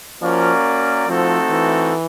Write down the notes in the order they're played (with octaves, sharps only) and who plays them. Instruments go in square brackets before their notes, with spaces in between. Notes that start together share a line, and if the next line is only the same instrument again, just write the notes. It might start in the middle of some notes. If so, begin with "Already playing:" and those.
[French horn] F3 [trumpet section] A#3 C#4 F#4 A#4 D5
[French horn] F3 [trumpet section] A3 C4 D#4 F#4 A4
[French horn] E3